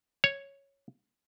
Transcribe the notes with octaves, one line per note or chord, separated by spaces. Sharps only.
C#5